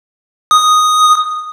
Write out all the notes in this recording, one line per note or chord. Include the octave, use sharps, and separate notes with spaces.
D#6